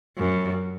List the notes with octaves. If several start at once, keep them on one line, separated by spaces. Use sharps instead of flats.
F#2